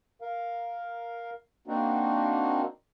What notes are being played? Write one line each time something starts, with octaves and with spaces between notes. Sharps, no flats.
A#4 F5
A#3 C4 D4 D#4 F#4